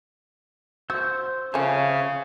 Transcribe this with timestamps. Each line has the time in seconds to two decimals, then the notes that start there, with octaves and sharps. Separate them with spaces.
0.90 F#4 C5 E6 G6
1.54 C#3 F3 C#4 C5 E5 F5